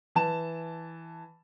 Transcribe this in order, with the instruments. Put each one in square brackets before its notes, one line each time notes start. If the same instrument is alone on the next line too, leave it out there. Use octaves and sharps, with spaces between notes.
[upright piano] E3 A5 E7